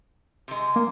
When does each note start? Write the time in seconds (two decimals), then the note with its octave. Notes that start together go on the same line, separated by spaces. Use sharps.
0.48 C3 G#3
0.76 A#3